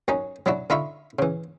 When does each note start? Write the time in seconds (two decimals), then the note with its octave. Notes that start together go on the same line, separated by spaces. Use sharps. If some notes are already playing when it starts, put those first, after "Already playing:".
0.08 F#2 F#3 C#4 D#4
0.46 F#3 D4 E4 F#4
0.70 D3 D#4 F4 E5 B5 C#6
1.19 C#3 E3